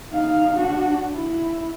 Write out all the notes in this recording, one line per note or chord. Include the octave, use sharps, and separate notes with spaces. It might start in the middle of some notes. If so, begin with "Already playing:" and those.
D#4 F5
D4 F#4
E4